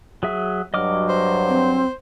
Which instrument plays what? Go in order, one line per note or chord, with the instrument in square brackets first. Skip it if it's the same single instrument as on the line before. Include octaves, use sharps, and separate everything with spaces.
[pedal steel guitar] F#3 G#4 E5
[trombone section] G2 F#3 [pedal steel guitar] D#5 D6 F6
[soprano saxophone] C5
[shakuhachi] C4